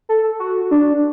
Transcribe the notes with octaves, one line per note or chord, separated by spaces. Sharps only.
A4
F#4
D4